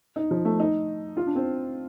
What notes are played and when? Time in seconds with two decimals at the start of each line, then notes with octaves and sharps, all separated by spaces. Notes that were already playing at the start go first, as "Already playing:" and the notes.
0.16 D#4
0.31 F3
0.45 A3
0.60 D#4
1.17 F4
1.26 D4
1.35 C4